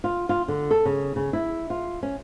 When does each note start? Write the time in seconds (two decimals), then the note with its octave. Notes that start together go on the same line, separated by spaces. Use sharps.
0.04 F4
0.29 F4
0.48 D3
0.71 A4
0.85 C#3
1.16 C#3
1.33 E4
1.70 F4
2.03 C#4